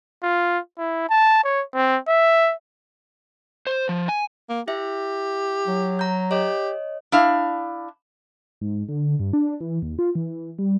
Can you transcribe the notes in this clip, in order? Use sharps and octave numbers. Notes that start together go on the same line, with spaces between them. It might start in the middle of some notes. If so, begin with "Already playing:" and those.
F4
E4
A5
C#5
C4
E5
C5
F3
G#5
A#3
E4 G4 E5
F#3
A#5 G6
G4 C#5 D#5
D4 E4 F5
G#2
D3
G2
D4
E3
D#2
F4
E3
G3